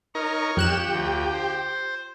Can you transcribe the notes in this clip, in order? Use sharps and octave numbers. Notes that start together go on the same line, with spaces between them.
D#4 A#4 C#5 C#6 F6
F2 F4 G4 F#6 E7
D2
C5